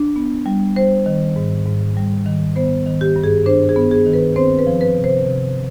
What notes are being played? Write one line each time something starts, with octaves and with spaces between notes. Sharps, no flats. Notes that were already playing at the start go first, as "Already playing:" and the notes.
Already playing: D4
B3
G3
G3 C5
D#3
G#2
G#2
G3
D#3
B3 C5
D#3
G4
G2
G#4
D4 C5
G#4
B3
G#4
D#3
B4
C4 C5
B4
F3
B4
C3
C5
C3